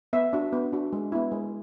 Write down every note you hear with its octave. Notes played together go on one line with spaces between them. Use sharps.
B3 E5
D4 F#4
B3
D4 F#4
G#3
B3 E4
G#3